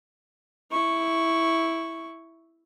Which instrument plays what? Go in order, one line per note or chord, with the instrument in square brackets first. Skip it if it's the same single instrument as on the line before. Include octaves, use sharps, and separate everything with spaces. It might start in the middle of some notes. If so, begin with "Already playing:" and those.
[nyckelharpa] E4 C#6